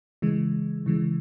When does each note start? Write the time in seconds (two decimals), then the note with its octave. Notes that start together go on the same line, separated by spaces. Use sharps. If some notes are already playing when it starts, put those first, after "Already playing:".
0.22 C#3 E3 G#3
0.86 C#3 E3 G#3